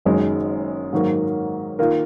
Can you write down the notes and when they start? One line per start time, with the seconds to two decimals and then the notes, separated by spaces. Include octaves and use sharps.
0.05 F#1 F#2 D#3 G#3 D#4
0.93 G#2 D#3 F#3 A#3
1.79 D#3 A#3 F4 A#4